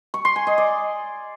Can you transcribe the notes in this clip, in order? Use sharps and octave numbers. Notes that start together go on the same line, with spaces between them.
C#6
C6
G#5
D#5
D5